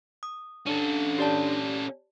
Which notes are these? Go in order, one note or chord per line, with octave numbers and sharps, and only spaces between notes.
D#6
C#4 D4 A4
G4 D5 A5